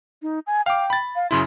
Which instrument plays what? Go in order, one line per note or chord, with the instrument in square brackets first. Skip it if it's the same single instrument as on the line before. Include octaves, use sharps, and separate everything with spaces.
[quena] D#4
G#5
[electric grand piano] F5 D6 [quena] G5
[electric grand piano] B5 A6
[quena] F5
[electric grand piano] F#2 C#3 E4 [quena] C6